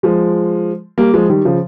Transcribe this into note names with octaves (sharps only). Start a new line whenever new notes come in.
F3 G#3
G3 A#3
F3 G#3
D#3 G3
C#3 F3